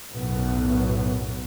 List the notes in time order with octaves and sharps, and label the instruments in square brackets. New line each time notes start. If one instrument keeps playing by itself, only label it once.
[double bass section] B1 F#2 A2 F#3 B3